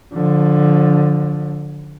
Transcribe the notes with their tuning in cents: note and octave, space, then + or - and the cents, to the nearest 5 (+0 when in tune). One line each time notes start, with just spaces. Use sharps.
D3 +0 F3 +25